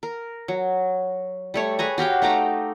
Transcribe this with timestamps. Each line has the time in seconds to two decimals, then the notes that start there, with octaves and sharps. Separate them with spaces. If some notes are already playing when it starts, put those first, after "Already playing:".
0.03 A#4
0.48 F#3
1.54 G3 A3 C#5
1.79 G#4 B4 G#5 A#5
1.98 F#4 G4 F5 G5
2.22 A3 D#4 A#5 D6